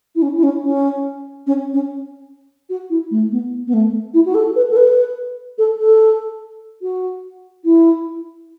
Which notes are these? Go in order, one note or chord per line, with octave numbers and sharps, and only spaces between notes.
E4
C#4
E4
C#4
C#4
C#4
C#4
F#4
E4
A3
B3
B3
A3
E4
F#4
A4
B4
A4
B4
A4
A4
F#4
E4